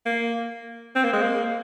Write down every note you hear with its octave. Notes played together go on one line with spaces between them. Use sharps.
A#3
C4
A#3
G#3
A#3